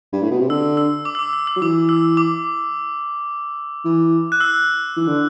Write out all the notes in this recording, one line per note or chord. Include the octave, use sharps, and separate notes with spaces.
G2
A2
B2
C3
D3 E6
E6
D6
E6
D6
E6
E6
F#3
E3 D6
E6
D6
E3
F#6
E6
E3
D3